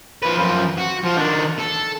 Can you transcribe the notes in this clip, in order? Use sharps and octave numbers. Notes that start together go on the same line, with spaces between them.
F3 B4
F#2 F3
F#4
F3
D#3 D4
A4